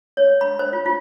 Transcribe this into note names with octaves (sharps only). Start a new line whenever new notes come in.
C#5
B5
C5
F4
F4